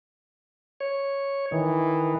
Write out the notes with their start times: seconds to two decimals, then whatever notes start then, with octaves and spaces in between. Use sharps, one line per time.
0.80 C#5
1.52 D#3 E3